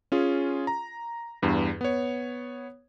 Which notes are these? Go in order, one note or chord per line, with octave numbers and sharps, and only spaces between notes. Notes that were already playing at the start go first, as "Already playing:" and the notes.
C#4 F4 G#4
A#5
E2 G2
B3 C#5